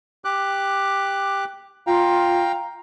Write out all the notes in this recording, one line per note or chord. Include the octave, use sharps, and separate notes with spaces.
G4 D6 F#6
F4 F5 G5 A#5